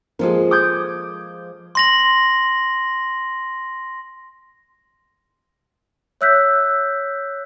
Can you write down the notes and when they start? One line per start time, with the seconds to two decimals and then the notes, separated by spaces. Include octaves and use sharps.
0.19 F3 G#3 A#3 F4 G#4 A4
0.51 D6 D#6 G6 G#6
1.75 C6 A#6 F#7
6.21 C#5 E5 E6 F#6 G6 B6